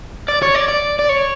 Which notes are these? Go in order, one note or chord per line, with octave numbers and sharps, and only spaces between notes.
D5
C#5
D5
D5
D5
C#5